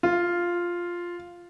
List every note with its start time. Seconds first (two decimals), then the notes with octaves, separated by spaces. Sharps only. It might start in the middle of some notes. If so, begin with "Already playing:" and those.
0.03 F4